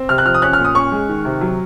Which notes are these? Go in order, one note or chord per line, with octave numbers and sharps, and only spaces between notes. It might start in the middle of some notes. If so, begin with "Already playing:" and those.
Already playing: C4
C3 F6
F#6
F3 F6
D#6
C#4 F#6
F6
A#2
D#6
C#4 C#6
G#3
D#3
C3
F#3